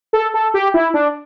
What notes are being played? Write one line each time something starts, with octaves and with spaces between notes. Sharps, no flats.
A4
A4
G4
E4
D4